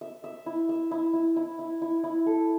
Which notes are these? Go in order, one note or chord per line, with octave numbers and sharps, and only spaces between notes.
E5
E5
E4
E5
E4
E4
E4
E4
E4
E4
A4